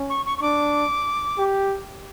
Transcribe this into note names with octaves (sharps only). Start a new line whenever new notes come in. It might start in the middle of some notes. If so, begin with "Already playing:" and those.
Already playing: C#4
C#6
C#6
C#6
D4 D6
G4